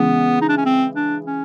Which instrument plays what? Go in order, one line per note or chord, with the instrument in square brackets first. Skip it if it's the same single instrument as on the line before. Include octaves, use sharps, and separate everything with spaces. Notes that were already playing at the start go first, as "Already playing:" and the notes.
Already playing: [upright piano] C#3 E3 G#3 [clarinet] B3
[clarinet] D#4
D4
C#4
C4
D4
C#4